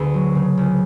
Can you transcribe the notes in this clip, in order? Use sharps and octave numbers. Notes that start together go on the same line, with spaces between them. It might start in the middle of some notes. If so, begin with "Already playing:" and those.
Already playing: D2 B3 G#4 B4
F#3
C#3
C#2